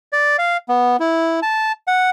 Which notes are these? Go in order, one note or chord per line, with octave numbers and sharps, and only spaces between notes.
D5
F5
B3
E4
A5
F#5